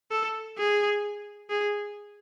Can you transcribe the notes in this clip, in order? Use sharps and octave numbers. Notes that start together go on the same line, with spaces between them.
A4
G#4
G#4